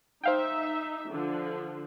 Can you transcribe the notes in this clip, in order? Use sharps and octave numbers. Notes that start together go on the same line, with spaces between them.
D#4 C5 E5 F5 G5
D3 F3